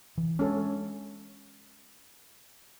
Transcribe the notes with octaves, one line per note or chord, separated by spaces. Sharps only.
E3
G#3 B3 C#4 D4 A4